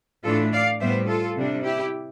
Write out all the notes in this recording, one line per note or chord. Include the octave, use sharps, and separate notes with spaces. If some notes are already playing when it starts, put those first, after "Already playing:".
A2 E3 A3 D4 F4 A4
D5 F5
A2 G3 B3 C5 E5
F4 A4
C3 G3 D4
E4 G4